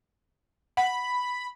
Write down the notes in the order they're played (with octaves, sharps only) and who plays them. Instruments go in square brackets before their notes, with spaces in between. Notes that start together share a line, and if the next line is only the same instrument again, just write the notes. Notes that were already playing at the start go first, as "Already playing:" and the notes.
[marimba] F#5 [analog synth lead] B5